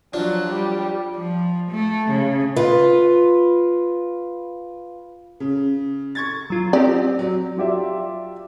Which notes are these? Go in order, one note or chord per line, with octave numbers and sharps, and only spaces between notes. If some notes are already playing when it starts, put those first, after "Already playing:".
F3 F#3 D4
G3
F3
A3
C#3
F4 B4
C#3
C#6 G#6 A6
F#3 F4
C4 G4 D5
F#3
F#3 F4 G4 D5 E5